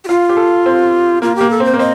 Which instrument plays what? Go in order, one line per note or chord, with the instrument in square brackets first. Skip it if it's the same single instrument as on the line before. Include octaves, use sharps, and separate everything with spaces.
[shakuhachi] G4
[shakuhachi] F4 [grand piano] F5
[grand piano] G4
A4
C4
[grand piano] A#3 [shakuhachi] F4
[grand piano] A#3 [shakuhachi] G4
[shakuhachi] A4
[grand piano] C4 [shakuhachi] C5
[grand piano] A#3
[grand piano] C4 [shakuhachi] D#5